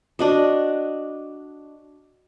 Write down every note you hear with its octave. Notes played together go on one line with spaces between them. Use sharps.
D4 F#4 D#5